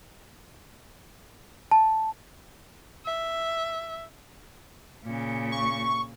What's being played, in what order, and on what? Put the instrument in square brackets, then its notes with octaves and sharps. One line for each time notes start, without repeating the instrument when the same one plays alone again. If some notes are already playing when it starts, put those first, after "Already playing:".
[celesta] A5
[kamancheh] E5
[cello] A#2 C#3
[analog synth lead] C#6